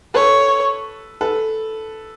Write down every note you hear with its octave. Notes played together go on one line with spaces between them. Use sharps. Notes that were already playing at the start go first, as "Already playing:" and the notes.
A4 B4 C#5
A4 B4